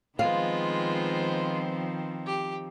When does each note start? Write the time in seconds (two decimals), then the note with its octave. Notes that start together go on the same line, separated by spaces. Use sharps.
0.19 D#3 F3 G#3 B3 C4 F4 C5 F5
2.26 G4